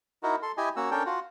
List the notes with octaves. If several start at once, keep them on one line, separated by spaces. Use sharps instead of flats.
D#4 E4 F#4 A#4
A4 C6
E4 G4 D#5 G#5
A#3 C#4 F#4 E6
C#4 D4 A4 A#4 G5
F4 F#4